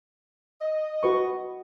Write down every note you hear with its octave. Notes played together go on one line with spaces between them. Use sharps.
D#5
F#4 B4 C#6